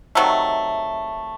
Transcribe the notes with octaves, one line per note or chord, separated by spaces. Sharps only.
C3 D#3 F#3 A3